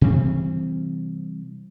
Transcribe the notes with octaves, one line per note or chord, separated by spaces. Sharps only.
C3 E3 G3 C4